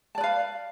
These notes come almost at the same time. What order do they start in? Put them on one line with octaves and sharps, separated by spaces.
A5 D5 B4 F5